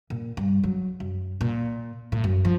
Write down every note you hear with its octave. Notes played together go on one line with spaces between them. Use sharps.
A#2
G2
F#3
F#2
A#2
A2
F#2
F3